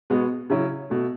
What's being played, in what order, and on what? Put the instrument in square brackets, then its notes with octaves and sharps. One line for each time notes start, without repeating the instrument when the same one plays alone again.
[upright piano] B2 G#3 B3 F#4
C#3 F#3 C#4 E4
B2 A3